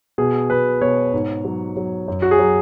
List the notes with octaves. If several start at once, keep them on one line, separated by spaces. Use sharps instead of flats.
B2 G#4
B2 B4
B2 C#5
G#2
F#3
F#3
F#2
F#4
G#4
F#3